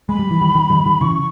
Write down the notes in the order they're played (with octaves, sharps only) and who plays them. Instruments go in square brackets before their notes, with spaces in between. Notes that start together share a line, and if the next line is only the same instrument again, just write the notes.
[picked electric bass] G#3 [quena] B5
[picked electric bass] G3
E3
D#3 G3
D#3 G3
D#3 G3
D#3 G3
[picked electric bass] C#3 E3 [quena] C#6